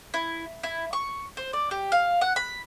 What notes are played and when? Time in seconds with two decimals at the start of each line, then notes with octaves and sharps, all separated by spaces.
0.14 E4
0.63 E4
0.93 C#6
1.37 C5
1.53 D5
1.71 G4
1.92 F5
2.21 F#5
2.36 B5